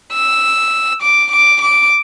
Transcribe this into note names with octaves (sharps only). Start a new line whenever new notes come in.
E6
D6
D6
D6